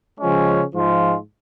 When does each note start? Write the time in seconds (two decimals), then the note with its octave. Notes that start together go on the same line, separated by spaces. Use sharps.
0.20 C#3 F3 G#3 C#4
0.73 G#2 F3 G#3 F4